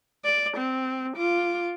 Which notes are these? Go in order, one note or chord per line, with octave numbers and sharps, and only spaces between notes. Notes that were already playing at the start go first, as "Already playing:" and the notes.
D5
C4
F4 D6